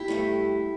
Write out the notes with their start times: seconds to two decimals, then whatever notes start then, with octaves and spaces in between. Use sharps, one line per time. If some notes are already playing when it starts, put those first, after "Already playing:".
Already playing: E4 G4
0.08 G2 D3 A3